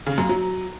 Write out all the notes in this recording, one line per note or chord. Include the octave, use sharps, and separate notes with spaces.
C#3
F#2
F#3